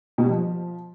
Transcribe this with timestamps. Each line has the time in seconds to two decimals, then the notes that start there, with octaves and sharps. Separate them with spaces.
0.18 B2
0.24 G3
0.29 F3